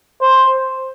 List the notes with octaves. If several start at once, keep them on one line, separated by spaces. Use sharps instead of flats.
C5